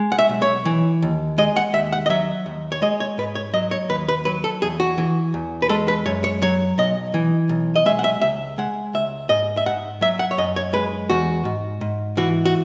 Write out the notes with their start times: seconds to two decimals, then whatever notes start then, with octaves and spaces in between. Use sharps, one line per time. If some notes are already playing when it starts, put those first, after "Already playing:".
Already playing: G#3
0.12 F#5
0.19 E5
0.29 B1
0.42 C#5
0.65 E3
1.02 D#2
1.38 G#3 D#5
1.57 F#5
1.73 D#2 E5
1.93 F#5
2.06 D#5
2.10 F#3 E5
2.46 D#2
2.72 C#5
2.82 G#3 D#5
3.00 C#5
3.18 G#2 B4
3.35 C#5
3.53 F#3 D#5
3.71 C#5
3.89 D#2 B4
4.08 B4
4.25 F#3 B4
4.44 A4
4.62 E2 G#4
4.80 F#4
4.98 E3
5.34 E2
5.62 B4
5.69 G#3 A4
5.88 B4
6.06 F#2 C#5
6.24 C#5
6.42 F#3 C#5
6.78 B1 D#5
7.14 E3
7.49 B1
7.76 D#5
7.86 G#3 E5
7.99 F#5
8.04 E5
8.22 C#2 E5
8.58 G#3 F#5
8.94 C#2 E5
9.29 G#2 D#5
9.57 E5
9.66 G#2 F#5
10.01 F#3 E5
10.19 F#5
10.31 C#5
10.38 F#2 D#5
10.56 C#5
10.73 G#3 B4
11.10 E2 F#4
11.45 G#2
11.81 G#2
12.17 E3 F#4
12.46 F#4